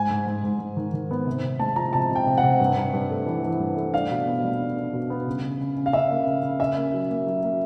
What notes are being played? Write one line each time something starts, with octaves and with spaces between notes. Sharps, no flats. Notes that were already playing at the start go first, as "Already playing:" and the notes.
Already playing: G#2 G#5
G#2
G#2
G#2
G#2
D#3
D#3
B3
C3
C3
G#3 A5
F3 A#5
C3 A5
C3
G5
C3
F#5
C3
G2
G2
G2
A3
E3
E3
G2
A3
D4 F5
B2
B3
G3
D4
D4
B2
B3
C#3
C#3
C#3
C#3
F5
C#3 E5
A#3
C#3
C#3
C#4 E5
A#3
F#3
A#3
F#3
A#3